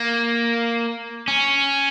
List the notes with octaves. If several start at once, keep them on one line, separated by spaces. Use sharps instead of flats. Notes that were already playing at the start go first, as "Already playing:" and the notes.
Already playing: A#3
C#4